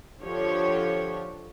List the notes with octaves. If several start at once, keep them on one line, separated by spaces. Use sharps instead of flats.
D3 F3 G4 C#5